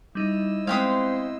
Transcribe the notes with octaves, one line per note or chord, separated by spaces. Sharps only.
G3 D#4 E4 D#5 E6
G#3 B3 C4 C5 F5 G5 D#6